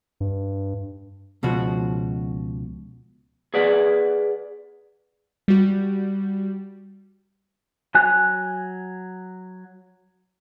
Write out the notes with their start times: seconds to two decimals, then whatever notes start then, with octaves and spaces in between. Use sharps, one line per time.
0.20 G2
1.43 C#2 B2 F3 F#4
3.54 G#4 B4 D5 F#5
5.48 G3 F#4
7.95 F#3 G#5 F#6